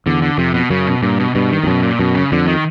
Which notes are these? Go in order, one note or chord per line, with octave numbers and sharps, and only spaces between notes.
E2 D3
D3
F2 C3
B2
F#2 C#3
B2
G2 A#2
B2
G2 B2
D#3
F2
F#2 B2
A#2
F#2 B2
C#3
F2 D3
D#3